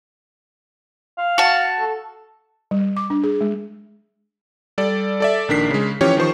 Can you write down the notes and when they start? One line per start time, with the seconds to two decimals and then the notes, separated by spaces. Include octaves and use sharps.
1.18 F5
1.38 F#4 A5
1.80 A4
2.71 G3
2.97 D6
3.10 D4
3.24 G#4
3.41 G#3
4.78 G3 A4 D5
5.20 A4 D5 E5
5.48 A#1 D#3 D4 A#4 B6 C7
5.71 C#3 G#3
6.01 E3 F3 C#4 G4 C#5
6.17 D#3 F3 C5 C#6